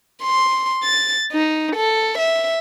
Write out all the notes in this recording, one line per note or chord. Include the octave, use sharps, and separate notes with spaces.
C6
A6
D#4
A4
E5